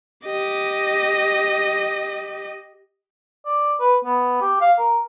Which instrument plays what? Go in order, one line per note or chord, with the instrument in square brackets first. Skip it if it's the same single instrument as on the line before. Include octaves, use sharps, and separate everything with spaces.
[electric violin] G4 D#5
[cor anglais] D5
B4
B3
G4
F5
A#4